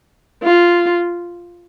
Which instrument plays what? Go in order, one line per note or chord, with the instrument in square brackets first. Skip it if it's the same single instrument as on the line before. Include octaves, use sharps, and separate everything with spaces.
[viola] F4